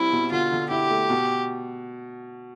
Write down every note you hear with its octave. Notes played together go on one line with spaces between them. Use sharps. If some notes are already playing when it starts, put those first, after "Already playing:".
Already playing: C2 G3 C4 E4
B2
D3 F4
D3
E4 G4
A3
B2